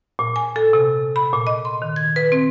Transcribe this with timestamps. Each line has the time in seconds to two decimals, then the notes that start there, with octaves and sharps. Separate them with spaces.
0.19 A#2
0.36 G#5
0.56 A4
0.73 C3
1.16 B5
1.34 A#2
1.47 D#5
1.65 C6
1.82 D#3
1.96 G#6
2.16 B4
2.32 C4